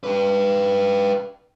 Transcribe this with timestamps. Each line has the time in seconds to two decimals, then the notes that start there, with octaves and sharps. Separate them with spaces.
0.04 G4 B4